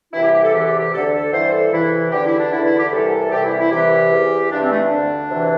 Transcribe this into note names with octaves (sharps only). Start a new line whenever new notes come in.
C2 C3 E3 E4
G4
G4
A4
E2 C3 E3 G4
G4
G4
D2 D3 A4
A4
G2 E3 C5
A4
E2 C3 E3 E4
E2 D3 G4
E4
D4
E2 D3 E4
E4
G4
C2 C3 E3 A4
C2 C3 E3 G4
E4
E4
C2 C3 E3 G4
E2 E3
G2 E3 D4
C4
A3
D4
D2 D3
D2 C3 E3